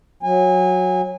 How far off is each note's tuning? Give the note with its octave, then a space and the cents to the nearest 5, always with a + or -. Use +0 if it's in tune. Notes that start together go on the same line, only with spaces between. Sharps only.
F#3 -15 G#5 -25